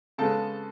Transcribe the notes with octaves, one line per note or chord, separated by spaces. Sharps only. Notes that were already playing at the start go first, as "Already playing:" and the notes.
C#3 G#3 B3 A4 A5